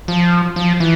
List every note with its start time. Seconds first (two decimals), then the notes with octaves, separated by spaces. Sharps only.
0.08 F3
0.56 F3
0.80 E3